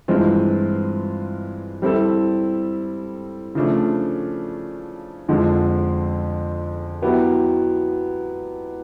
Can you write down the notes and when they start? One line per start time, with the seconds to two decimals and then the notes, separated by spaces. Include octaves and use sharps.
0.08 G2 E3 G#3 C4 F4
1.82 G3 C4 E4 A4
3.55 C#3 F3 A3 D4
5.28 F2 D3 F3 G#3
7.02 F#3 B3 E4 G4